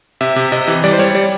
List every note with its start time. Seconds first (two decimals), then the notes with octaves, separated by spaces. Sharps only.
0.21 C3 E5
0.36 C3
0.52 C3 D#5
0.68 E3
0.84 G3 D5
0.93 C5
0.99 G3 C#5
1.15 G3 D5